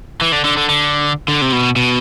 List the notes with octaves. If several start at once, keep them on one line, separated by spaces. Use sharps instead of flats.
E3
D3
D3
D3
D3
D3
C3
B2
B2